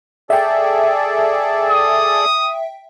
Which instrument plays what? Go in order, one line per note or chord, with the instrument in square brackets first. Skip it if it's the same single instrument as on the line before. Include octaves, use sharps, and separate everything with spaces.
[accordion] G#4 A4 D5 [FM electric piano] E5 G5
[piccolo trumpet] D#6